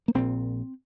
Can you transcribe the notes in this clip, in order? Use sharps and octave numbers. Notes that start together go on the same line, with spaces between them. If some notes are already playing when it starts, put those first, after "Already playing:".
A#3
A#1 A#2 C4